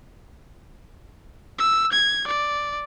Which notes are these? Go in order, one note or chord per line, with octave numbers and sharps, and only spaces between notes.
E6
G#6
D5